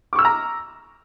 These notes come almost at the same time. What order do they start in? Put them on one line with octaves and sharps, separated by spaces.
D6 C#6 E6 F6 A#5